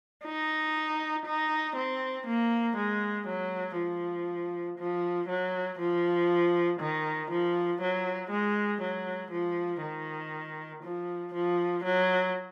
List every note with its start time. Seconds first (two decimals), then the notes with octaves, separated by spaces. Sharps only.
0.25 D#4
1.25 D#4
1.76 C4
2.27 A#3
2.76 G#3
3.27 F#3
3.78 F3
4.79 F3
5.28 F#3
5.79 F3
6.80 D#3
7.31 F3
7.81 F#3
8.30 G#3
8.82 F#3
9.32 F3
9.82 D#3
10.83 F3
11.34 F3
11.84 F#3